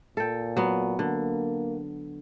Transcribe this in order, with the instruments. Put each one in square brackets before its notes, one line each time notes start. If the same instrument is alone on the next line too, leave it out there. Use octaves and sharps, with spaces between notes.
[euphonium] A#2 [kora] A4 G5
[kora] F#3 B3
[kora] D3 [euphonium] A#3